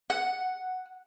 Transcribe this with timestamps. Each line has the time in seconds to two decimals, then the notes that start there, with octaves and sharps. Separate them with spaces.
0.10 F#5